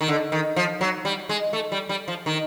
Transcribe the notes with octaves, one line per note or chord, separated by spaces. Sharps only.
D#3
D3
D#3
F3
F#3
G3
G#3
A3
G3
G3
F3
D#3